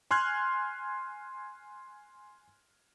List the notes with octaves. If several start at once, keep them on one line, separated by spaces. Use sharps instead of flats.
G#5 C6 F6 F#6 G#6